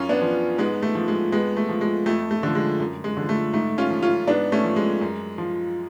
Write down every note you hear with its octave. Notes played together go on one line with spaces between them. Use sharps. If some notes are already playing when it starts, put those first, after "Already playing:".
Already playing: F#2 C#4 F4
B3 D4
F3
G#2 G#3 B3
A3
F3
G#3
F2 G#3 B3
A3
F3
G#3
F2 A3
A3
D3 F3
G#3
F#2
G#3
D3 F3
A3
G#2 A3
C#4 F4
F3
C#4 F4
G#2 B3 D4
A3 C#4
F3
G#3
F#2
F3